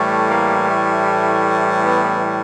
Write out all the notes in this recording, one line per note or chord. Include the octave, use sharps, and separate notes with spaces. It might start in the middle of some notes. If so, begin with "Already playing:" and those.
Already playing: A2 E3 G3 A3
A#3
A3
B3